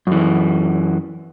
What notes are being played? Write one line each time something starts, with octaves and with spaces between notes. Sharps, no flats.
F#2 E3